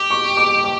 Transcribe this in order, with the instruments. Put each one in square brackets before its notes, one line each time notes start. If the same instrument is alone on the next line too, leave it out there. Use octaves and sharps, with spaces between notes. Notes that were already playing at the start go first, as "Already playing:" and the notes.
Already playing: [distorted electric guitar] G4 [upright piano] D6
[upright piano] C#6
D6
D6